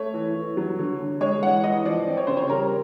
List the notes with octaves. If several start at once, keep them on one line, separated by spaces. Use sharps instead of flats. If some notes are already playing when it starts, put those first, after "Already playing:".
Already playing: A3 C#5
E3
E3
F#3
D3
D3
G#3 C#5
E3 F#5
E3 D#5
F3 D5
C4
C#5
C#3 C5
C#5
G3 A#4